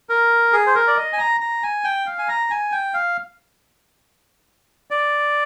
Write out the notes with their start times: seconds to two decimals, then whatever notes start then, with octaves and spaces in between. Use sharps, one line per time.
0.09 A#4
0.53 G#4
0.67 C5
0.75 A#4
0.87 D5
0.97 D#5
1.13 G#5
1.18 A#5
1.41 A#5
1.63 G#5
1.84 G5
2.06 F5
2.18 G#5
2.28 A#5
2.50 G#5
2.72 G5
2.94 F5
4.91 D5